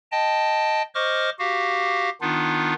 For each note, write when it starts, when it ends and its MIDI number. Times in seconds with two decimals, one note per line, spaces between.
0.12 0.82 75
0.12 0.82 79
0.12 0.82 81
0.95 1.30 72
0.95 1.30 75
0.95 1.30 85
0.95 1.30 86
0.95 1.30 89
1.39 2.10 66
1.39 2.10 67
1.39 2.10 77
2.21 2.74 51
2.21 2.74 59
2.21 2.74 62
2.21 2.74 63
2.21 2.74 65